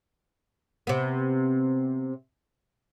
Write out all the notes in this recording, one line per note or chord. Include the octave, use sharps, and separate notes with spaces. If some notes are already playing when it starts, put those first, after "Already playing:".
C3 B3